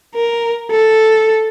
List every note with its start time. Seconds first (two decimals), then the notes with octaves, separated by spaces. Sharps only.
0.14 A#4
0.71 A4